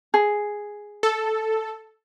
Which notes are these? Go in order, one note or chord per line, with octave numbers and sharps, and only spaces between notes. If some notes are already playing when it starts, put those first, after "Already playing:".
G#4
A4